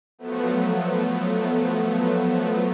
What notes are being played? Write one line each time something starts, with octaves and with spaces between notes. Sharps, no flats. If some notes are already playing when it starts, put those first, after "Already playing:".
F3 F#3 A3 B3